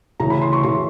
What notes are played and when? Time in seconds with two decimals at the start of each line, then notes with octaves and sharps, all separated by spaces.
0.19 D2 C#3 E3 A#5
0.30 B5
0.42 C6
0.53 C#6
0.63 C#3 E3 C6